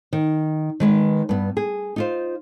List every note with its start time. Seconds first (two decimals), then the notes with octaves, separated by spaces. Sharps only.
0.13 D#3
0.80 D#3 G#3 B4
1.29 G2 B3
1.57 G#4
1.96 D#4 F4 C5